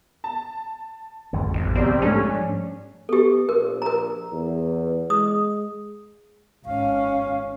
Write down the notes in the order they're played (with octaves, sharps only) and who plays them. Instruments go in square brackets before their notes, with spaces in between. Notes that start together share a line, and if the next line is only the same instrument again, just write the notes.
[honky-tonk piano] A5
[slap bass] G#1 F2 D3
[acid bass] A1
[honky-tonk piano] C2 G2 [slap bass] B3 [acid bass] C4
[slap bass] G#2 F3 G3 [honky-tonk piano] A3 D4 [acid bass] C#4
[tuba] B3 [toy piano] G4 A4
[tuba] A#1 [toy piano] A#4
[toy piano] A#4 A#5
[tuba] E2
[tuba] G#3 [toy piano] D#6
[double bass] G#1 C#4 [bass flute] F5